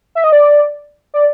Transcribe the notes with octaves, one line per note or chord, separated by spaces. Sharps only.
E5
D#5
D5
D5